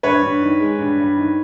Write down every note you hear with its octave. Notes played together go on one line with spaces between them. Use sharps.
G2 B4 C#5
G2
D#3
G#3
G2
G2
D#3